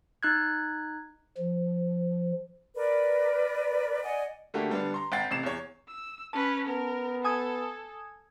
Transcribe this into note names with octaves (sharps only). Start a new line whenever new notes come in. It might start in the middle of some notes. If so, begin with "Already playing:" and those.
D#4 F#6 G#6
F3
A#4 B4 D5
D5 D#5 F#5 G#5
D3 A3 A#3 F#4 G4
D3 G3 B3 D4
A#5 C6
G#1 F#5 G5 A6 C7
A1 C3 C7 E7
E2 C#5
E6
C#4 B4 A5
B3 A#4
A4 G#5 D#6 G#6